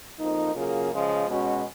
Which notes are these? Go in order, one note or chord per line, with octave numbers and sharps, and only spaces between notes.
F2 F3 A#3 D#4
C#3 F#3 A#3 F4 G#4
C#3 F3 G#3
B2 G#3 C#4 F#4